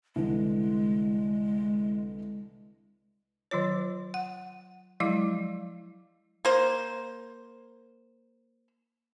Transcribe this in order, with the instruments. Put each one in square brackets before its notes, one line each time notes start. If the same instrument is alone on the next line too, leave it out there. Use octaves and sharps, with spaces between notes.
[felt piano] C2 D3 E3 [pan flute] G#3
[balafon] D#3 F#3 F4 C#5
F#5
F3 F#3 G#3 E4 F5 D6
[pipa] A#3 C5